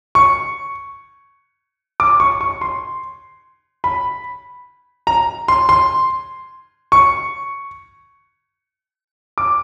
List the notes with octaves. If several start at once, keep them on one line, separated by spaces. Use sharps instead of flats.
C#6
D6
C#6
C#6
C6
B5
A#5
C6
C6
C#6
D6